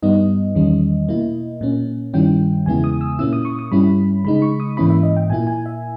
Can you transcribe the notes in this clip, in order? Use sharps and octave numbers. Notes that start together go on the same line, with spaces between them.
G2 G3 B3 D#4 D#5
E2 D#3 G3 C#4
B2 A#3 E4
A#2 A#3 C#4
G2 D#3 G3 C#4 E4 G5
E2 C#3 G#3 B3 E4 G#5
D#6
E6
A#2 A#3 C#4 E4 E6
D#6
C#6
D#6
G2 G3 C#4 E4 B5
C#3 G#3 D#4 B5
C#6
D#6
G#2 E3 A#3 C#4 E4 B5
E5
D#5
G5
A#2 A#3 E4 G#5
G#5
E5